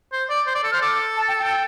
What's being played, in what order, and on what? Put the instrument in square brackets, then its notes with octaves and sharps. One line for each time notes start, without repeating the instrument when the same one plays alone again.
[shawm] C5
D5
C5
D5
A4
[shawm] C5 [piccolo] F6
[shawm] A4 [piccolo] D6
[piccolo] A5
G5
G5